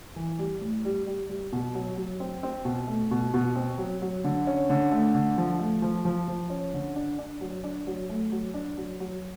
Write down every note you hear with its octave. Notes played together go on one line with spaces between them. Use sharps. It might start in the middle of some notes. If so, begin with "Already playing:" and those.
E3
G3
A2
G3
G3
G3
B2
F#3
F#3
C4
C4
B2
A3
B2
B2
C4
F#3
F#3
D3
C#4
D3
A3
D3
F3
A3
F3
F3
F3
C#4
D3
D4
D4
F#3
D4
F#3
A3
F#3
D4
F#3
F#3